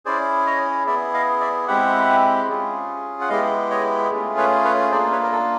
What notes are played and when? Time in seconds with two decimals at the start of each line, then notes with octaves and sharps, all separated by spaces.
0.05 C#4 E4 G#4 C5 D5
0.46 C#5 D#5
0.86 B3 E4 G#4 D5 E5
1.14 D#5 F5
1.40 D5 E5
1.67 G#3 C4 E4 G4 E5 F#5
2.49 C#4 F4 G#4
3.21 F#5
3.29 G#3 B3 E4 G4 D#5 F5
3.70 C#5 D#5
4.11 A3 C#4 F4 G#4
4.37 B4 C#5
4.64 B4 C#5
4.91 A#3 D4 F4 C5 D5
5.11 B4 C#5
5.23 A#4
5.32 A4